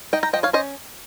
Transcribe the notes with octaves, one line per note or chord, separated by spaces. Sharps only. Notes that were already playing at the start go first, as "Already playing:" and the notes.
D#4 D#5 G5
G5 A#5
F3 D#5 G5
C#5 F5
C#4 C5 D#5